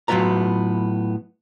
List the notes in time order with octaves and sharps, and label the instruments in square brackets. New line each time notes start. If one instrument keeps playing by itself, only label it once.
[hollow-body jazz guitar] A2 F#3 B3 F4 B4 A#5